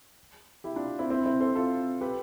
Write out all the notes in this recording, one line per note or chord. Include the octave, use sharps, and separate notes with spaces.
E4 G4
D4 F4
C4 E4
C4 E4
C4 E4
A4 C5
F4 A4
G4 B4